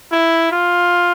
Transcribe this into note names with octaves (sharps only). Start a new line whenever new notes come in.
E4
F4